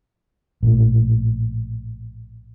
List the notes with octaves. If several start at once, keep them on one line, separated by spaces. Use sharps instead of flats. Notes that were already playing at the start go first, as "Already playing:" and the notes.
A#1 A2